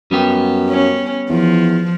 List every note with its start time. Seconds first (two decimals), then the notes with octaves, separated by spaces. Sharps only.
0.11 F#2 G3 B3 G4
0.70 C#4
1.30 E2 F3